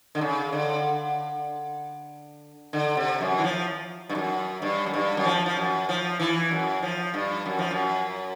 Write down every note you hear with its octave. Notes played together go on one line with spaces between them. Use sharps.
D3
C#3
D3
D3
C3
F#2
E3
F3
G2
F#2
G2
F#2
G2
F#2
F3
F3
F#2
F3
E3
F#2
F3
G2
F#2
F3
F#2